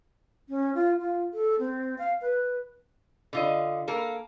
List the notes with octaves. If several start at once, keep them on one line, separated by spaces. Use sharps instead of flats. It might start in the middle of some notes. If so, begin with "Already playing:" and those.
C#4
F4
F4
A4
C4
F5
B4
D3 F4 D#5
A#3 A4 A#4